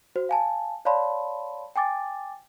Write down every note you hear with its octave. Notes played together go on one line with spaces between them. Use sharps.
F#4 C5
F5 G#5 A5
C#5 D5 F5 A5 B5 C6
G5 G#5 D6 A6